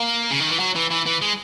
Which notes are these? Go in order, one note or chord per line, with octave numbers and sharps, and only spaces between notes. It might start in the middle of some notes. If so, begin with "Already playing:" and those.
Already playing: A#3
C#3
D#3
E3
F#3
E3
E3
E3
G#3